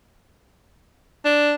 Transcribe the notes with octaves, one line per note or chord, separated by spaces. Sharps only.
D4